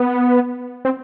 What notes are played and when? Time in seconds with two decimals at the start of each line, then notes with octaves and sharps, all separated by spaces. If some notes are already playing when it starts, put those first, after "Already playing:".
Already playing: B3
0.85 C4